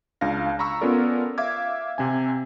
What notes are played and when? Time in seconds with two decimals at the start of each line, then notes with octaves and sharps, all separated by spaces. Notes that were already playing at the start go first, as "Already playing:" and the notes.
0.21 C#2 D4 F5 A#6
0.59 A#5 B5 C#6 E6
0.81 B3 C#4 F4 A4 A#4 D5
1.38 E5 F5 D6 G#6
1.98 C3 C4 G#5